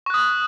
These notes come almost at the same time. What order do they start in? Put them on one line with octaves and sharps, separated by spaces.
C#6 F#6 D#6